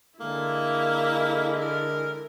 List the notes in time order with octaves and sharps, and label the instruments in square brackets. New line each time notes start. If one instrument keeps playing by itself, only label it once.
[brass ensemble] D3 G#3 [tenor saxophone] A#3 [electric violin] E4
[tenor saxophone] A#4